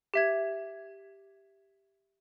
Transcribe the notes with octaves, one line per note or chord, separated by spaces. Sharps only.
G4 E5 G#6